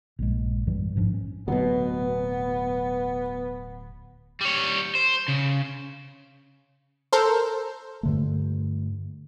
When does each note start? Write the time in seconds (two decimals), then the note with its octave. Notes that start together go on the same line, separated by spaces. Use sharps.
0.19 A#1 G2 G#3
0.67 F#2 A2 E3 G3
0.96 A1 G#2 F3 D4
1.14 C#4
1.48 D1 B2 F#3 B3
4.41 G3 C#5
4.95 C5
5.28 C#3
7.13 A4 A#4 C5
8.03 G2 D3 A3